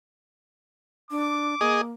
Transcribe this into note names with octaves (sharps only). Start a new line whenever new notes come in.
D4 D6
A#3 G#4 D#5